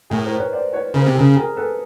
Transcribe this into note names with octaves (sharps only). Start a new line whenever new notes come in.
A2 G#4 A#4
A#4 C5
B4 C#5
C5 D5
B4 C#5
C#3 A#4 C5
C3
G#4 A#4
C#3
G#4 A#4
A4 B4